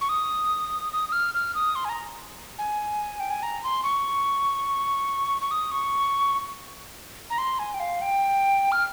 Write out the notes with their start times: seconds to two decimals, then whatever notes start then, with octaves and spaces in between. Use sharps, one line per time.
0.01 C#6
0.09 D#6
0.93 D#6
1.09 D#6
1.12 F6
1.34 F6
1.55 D#6
1.76 C6
1.85 G#5
1.89 A#5
2.59 G#5
3.20 G5
3.30 G#5
3.43 A#5
3.64 C6
3.83 C#6
5.42 C#6
5.51 D#6
5.71 C#6
7.30 A#5
7.38 C6
7.59 G#5
7.74 G5
7.80 F5
8.01 G5
8.72 F6